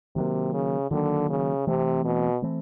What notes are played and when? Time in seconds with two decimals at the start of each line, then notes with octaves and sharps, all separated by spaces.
0.15 C3 D#3 F#3 A#3
0.53 C#3
0.91 D3 D#3 F#3 A#3
1.30 C#3
1.67 C3 E3 A3 C4
2.05 B2
2.42 E3 A3 C4